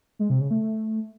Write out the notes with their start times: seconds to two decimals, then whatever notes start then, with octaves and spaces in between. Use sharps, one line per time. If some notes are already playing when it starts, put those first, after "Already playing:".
0.19 G#3
0.30 C3
0.40 C#3
0.51 A3